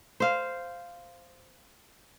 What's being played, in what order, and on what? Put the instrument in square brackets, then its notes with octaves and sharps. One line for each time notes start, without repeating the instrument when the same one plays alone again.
[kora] C5 F5